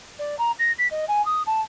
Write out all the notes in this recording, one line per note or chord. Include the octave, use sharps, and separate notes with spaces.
D5
A#5
A#6
B6
D#5
G#5
D#6
A5